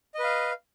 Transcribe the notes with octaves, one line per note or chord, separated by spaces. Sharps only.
B4 D#5 F5